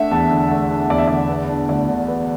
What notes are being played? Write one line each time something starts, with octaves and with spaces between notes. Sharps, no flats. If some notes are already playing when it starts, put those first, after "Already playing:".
Already playing: A3 D4 E5 F#5
E2 A5
D3
A3
D4
E2 D5
E5
D3 D5
B3
D4
D2 D5
D3
B3